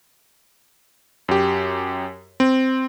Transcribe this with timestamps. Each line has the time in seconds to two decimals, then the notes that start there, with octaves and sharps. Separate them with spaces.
1.29 F#2 G4
2.40 C4